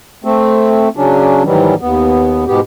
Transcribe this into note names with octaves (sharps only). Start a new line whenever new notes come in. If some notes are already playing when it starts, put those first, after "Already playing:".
A3 C4
C#3 F#3 C#4 D4
G#2 D#3 E3 F#3 G3
D#2 B3
G#2 B2 B3 G4